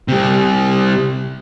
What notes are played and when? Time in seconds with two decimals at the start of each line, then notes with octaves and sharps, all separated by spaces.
0.08 C3 G3